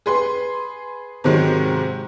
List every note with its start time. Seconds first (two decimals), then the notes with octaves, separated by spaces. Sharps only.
0.06 G#4 B4 C6
1.24 G#2 C3 D#3 F#3 G#3